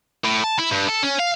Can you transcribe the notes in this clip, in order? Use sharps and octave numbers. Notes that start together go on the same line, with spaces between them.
A2
A5
E4
G2
A4
C#4
F5